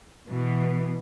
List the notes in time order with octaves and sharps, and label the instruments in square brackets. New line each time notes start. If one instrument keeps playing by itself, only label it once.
[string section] B2 E3